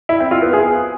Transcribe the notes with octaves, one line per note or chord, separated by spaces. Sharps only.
E4
C4
F4
B3
G#4